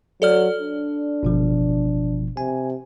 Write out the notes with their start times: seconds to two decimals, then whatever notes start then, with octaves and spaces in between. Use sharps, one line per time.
0.22 F#3 A4 D5 F6
0.61 D4
1.23 G1 B2 F3
2.37 C3 G#5